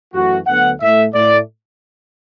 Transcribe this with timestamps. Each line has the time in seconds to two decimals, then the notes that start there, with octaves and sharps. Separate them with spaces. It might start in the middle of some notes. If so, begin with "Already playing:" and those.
0.12 F#2 E3 A3 F#4
0.46 D2 D3 F#3 B3 F#5
0.80 A2 A3 E5
1.13 A2 A3 D5